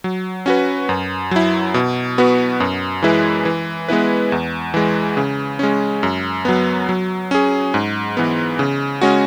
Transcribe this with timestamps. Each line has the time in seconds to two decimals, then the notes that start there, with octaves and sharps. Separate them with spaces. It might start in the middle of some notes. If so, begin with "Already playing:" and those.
0.04 F#3
0.46 C#4 F#4 B4
0.89 F#2
1.31 F#3 E4
1.74 B2
2.18 B3 F#4 B4
2.60 F#2
3.02 E3 G#3 E4 B4
3.45 E3
3.89 G#3 B3 E4 B4
4.32 E2
4.74 E3 G#3
5.17 C#3
5.59 G#3 C#4
6.03 F#2
6.45 F#3 B3
6.89 F#3
7.31 C#4 G#4
7.74 G#2
8.17 E3 B3
8.59 C#3
9.01 G#3 C#4 F#4